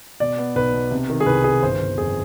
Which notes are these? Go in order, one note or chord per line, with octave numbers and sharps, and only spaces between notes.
B2 D5
B3
B1 B4
B2
C3
D#3
G#4
C2 B4
D#3 G#4
G1 C5
G1
F2 G#4